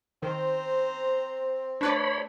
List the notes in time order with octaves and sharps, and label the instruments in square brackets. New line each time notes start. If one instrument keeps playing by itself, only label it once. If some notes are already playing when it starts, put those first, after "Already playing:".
[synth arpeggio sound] D#3 [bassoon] C4 [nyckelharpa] C5 A#5
[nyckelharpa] A3 [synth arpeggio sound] D4 B4 D5 [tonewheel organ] C#5 B5